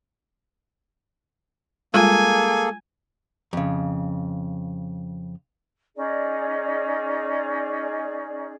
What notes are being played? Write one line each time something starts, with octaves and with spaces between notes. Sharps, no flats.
G3 G#3 A#3 F4 G#4 A4 G#5
F2 C#3
C#4 D#4 G#4 D5